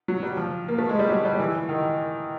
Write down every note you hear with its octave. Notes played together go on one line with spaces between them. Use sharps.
F#3
G3
F3
A#3
A3
G#3
G3
F#3
G3
E3
D#3